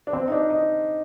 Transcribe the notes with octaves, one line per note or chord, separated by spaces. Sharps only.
D4
C4
D#4
D4
D#4